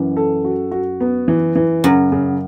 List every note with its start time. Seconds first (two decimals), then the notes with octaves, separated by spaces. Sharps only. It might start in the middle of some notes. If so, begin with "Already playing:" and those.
Already playing: F#2 E3
0.17 A4
0.45 F#4
0.71 F#4
1.01 B3
1.28 E3
1.56 E3
1.84 F#2 C#3
2.12 C#3